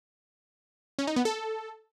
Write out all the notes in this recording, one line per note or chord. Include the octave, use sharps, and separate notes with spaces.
C#4
D#4
B3
A4